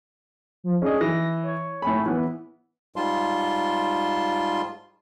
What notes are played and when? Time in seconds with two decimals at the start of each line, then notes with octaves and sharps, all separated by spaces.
0.64 F3
0.82 C#4 D4 G#4 D#5
1.01 E3 A#6
1.43 C#5
1.82 A2 G#5 B5
2.06 E3 B3 B4
2.96 G#2 G3 F4 A5 C6